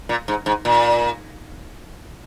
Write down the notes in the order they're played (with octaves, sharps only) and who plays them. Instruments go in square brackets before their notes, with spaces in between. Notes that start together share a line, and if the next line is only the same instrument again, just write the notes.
[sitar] A#2
G#2
G#2
A#2